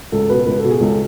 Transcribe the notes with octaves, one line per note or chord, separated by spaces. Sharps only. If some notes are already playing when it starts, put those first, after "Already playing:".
C#2 A4
B2 B4
C#2 B4
A4
B2
G#4
C#2 A4